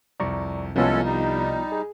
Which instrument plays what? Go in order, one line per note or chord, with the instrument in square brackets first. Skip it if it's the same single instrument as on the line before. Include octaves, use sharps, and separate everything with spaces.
[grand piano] C2 F2 [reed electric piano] D5 A#5 C#6
[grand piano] C2 [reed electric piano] F3 B3 F4 [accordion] G#3 C#4 A4
[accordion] G3 D#4
[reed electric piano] G#4